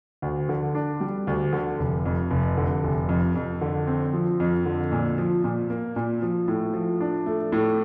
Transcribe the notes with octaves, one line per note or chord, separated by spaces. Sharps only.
D2
D3
D4
G3
D2
D3
F1
F2
F1
D3
F1
F2
F2
D3
C4
F3
F2
D3
A#2
F3
A#2
A#3
A#2
F3
A2
F3
D4
A3
A2